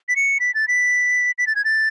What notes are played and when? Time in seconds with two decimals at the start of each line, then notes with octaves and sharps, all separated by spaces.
0.09 B6
0.16 C#7
0.40 B6
0.55 A6
0.68 B6
1.38 B6
1.47 A6
1.55 G#6
1.65 A6